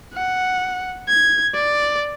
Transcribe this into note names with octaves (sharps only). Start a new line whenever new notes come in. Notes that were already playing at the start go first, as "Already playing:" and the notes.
F#5
G#6
D5